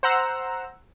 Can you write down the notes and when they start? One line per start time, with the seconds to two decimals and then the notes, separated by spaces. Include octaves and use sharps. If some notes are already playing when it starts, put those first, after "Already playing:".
0.03 C5 F#5 A#5 E6